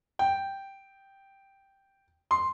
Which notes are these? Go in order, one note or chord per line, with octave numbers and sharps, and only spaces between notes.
G5
C6